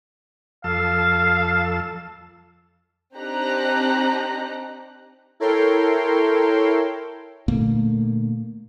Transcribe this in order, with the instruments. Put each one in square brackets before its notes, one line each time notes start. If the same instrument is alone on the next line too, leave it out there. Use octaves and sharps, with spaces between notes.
[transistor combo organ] F2 A4 E6 [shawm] F5
[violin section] C4 D4 D#4 G4 A#5 F#6
[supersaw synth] E4 A4 A#4 C#5 G5 C6
[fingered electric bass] A#2 D3 A3 A#3